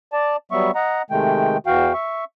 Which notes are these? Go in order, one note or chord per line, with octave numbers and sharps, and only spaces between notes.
D5 A5
F#3 G3 B3 E5 C#6
D#5 F#5 A#5
C3 D#3 G#3 A3 G5
E2 E3 F#4 F5 G5
E5 C#6